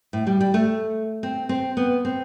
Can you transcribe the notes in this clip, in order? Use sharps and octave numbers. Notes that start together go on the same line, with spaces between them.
A2
G3
G3
A3
C4
C4
B3
C4